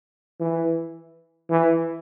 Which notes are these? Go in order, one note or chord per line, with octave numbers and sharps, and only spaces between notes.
E3
E3